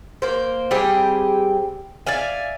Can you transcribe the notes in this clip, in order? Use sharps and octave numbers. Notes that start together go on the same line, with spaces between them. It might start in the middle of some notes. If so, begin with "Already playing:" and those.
A#3 C5
G3 C4 G4 G#4
D5 E5 F5 G#5